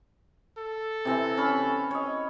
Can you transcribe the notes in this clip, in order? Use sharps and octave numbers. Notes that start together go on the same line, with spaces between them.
A4
C3 E3 C6
C#4 B5
C#5 D#5